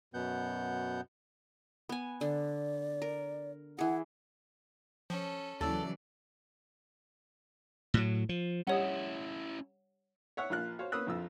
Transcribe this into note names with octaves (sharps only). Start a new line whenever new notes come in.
F#2 B2 B3 F#5 G6
B3 G#5
D3 D5
A#4
E3 G#4 F#5
F3 C#4 A4
D#2 C#3 E3 F#3 A4 D5
A2 F#3
F3
G3 C#4 E4 C#5 D#5 F#5
C#5 E5 F#5
A#1 A#3 F4 F6 F#6
F#4 C5 C#5 F5
A#3 C#4 B4 D#6 E6 F#6
A#1 F2 F4 E6